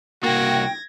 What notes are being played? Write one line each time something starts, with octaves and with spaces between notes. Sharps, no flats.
C2 A#3 F#4 G5 G#6 A#6